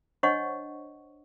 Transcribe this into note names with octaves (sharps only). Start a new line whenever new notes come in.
D4 C5 C#5 D#5 F#5 C#6